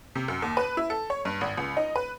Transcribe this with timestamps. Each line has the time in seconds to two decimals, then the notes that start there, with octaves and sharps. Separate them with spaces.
0.15 C3
0.28 F#2
0.42 D#2
0.57 B4
0.77 E4
0.90 A4
1.10 C#5
1.25 G2
1.41 G#1
1.58 C#2
1.77 D#4
1.96 B4